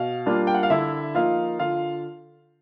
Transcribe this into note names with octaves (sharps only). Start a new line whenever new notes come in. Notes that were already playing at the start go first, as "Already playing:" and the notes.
Already playing: B2 F5
G3 A#3 D4 F4
G5
F#5
F5
D3 E4 E5
F3 A#3 D#4 F4 F5
D3 F4 F5